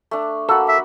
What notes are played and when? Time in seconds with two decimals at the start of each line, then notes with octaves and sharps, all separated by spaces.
0.11 A3 D4
0.49 A#3 F#4 A4 B5
0.68 E5